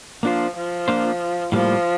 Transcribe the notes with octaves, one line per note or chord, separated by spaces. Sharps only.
F3 A#3 D4 F4 C5
F3
A#3 D4 F4 C5
A2 F3 G3 A#3